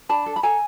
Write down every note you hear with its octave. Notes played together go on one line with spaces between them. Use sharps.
D4 A5 B5
A4
B5
A4 G#5 A#5